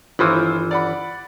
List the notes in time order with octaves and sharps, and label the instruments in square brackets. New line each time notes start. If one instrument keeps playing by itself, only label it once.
[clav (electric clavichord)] G1 D#3 E3 [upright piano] E4 F4 C5
[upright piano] D5 F#5 B5